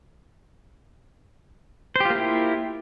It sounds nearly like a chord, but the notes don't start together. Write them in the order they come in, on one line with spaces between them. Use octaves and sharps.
C5 G4 F4 A#3 E4